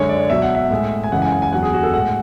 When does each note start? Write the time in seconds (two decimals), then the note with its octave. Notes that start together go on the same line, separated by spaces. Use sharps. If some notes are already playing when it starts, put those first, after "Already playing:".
Already playing: F#2 D3 G#3 C#5
0.09 D5
0.30 B2 F#3 E5
0.42 F#5
0.55 E5
0.71 A2 G#3
1.04 G#5
1.12 F#2 C#3 E3 G#3 F#5
1.22 G#5
1.32 F#5
1.42 G#5
1.53 E2 D3 F#3 F#5
1.63 G#4
1.73 F#4
1.83 A4
1.93 A2 G#3 F#5